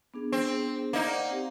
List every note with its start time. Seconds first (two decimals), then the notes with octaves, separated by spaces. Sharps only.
0.14 B3 D4 G#4
0.32 C4
0.93 A#3 D#4 D5
1.08 C5 D5 F#5
1.30 C4 G4 F5